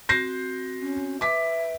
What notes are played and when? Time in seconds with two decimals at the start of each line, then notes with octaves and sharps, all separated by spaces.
0.09 C4 F#4 G6 A#6 C7
0.81 C#4
1.21 B4 E5 D6 B6